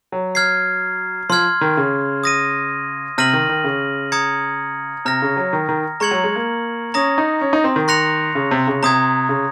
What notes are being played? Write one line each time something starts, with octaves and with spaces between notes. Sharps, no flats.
F#3
F6 G#6 C7
F3 C6 F6 G#6
D#3
C#3
D#6 A#6 D#7
C3 F6 A#6 D#7 F#7
D#3
D#3
C#3
A#5 D#6 G#6 C#7
C3 A#5 F6 A#6
C#3
F#3
D#3
D#3
G#3 A#5 C#6 G#6 C#7 F#7
F#3
G#3
A#3
C#4 A#5 D#6 A#6
D#4
C#4
D#4
C4
D#3
C6 F#6 A#6 C#7 F7
C#3
C3
C#3
C3 A#5 D#6 G#6
C#3